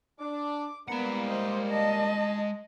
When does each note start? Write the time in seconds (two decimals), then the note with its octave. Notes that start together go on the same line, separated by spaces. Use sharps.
0.20 D4 D6
0.88 G3 G#3 A#3 B3 B4 D5 F#5 A#5
1.27 C5 D#5
1.70 D#5 A5